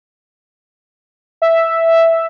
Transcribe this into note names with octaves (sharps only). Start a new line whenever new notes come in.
E5